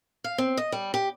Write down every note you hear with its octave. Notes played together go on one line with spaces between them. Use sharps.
F5
C4
D#5
G3
G4